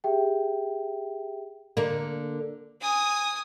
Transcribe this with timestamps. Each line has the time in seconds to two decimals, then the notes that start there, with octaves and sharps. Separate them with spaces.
0.04 G4 G#4 E5 G5
1.77 D3 A#3
2.81 G#5 D#6